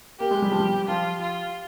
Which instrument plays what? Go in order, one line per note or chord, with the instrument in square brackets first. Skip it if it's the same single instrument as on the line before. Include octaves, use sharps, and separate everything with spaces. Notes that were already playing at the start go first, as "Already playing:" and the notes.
[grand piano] A#3 [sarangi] G4
[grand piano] G#3
G3
F3
G3
[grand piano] F3 [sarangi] F4
[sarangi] F4